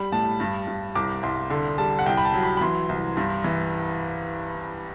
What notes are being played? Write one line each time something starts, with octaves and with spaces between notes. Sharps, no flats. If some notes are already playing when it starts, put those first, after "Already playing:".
Already playing: G3 B5
A2 A5
G2
G2
C2 D6
C2 C6
D3 C6
G3 A5
F#5
C2 G5
B5
A5
F#3
B5
B5
E3 C6
C2
G2
E3